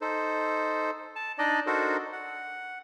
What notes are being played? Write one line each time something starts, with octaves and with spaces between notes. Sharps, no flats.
D#4 A4 C5
A5
D4 D#4 D5 D#5
D4 D#4 F#4 A4 A#4 C5
F#5